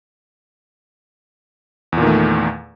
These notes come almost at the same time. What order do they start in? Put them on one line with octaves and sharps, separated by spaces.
E2 A#2 D#3 A3